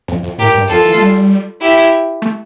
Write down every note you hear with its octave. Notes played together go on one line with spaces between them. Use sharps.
F2
F2
A2 G4 A#4
G2
F2 F4 A4
E3
A3
G3
E4 G4
A3